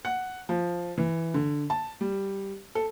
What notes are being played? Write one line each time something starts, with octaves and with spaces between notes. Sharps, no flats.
F#5
F3
E3
D3
A5
G3
A4